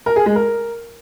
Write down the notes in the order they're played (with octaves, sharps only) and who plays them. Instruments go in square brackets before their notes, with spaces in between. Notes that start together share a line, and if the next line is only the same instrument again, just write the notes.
[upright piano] A#4
G#4
G#3
A#4